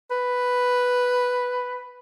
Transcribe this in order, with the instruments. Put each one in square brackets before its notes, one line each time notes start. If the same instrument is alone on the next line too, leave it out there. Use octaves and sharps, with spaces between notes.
[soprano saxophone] B4